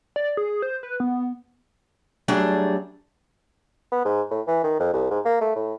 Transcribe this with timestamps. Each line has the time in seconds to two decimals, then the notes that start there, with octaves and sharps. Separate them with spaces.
0.16 D5
0.37 G#4
0.62 C5
0.83 B4
1.00 B3
2.28 F#3 G3 A3 D4 G#4
3.92 B3
4.05 G#2
4.31 A2
4.47 E3
4.64 D#3
4.79 F2
4.93 C2
5.11 G#2
5.25 A#3
5.41 A3
5.56 A2